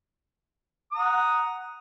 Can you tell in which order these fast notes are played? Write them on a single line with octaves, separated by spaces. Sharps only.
D#6 A#5 F#5